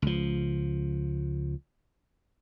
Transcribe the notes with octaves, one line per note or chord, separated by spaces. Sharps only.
C#2 F3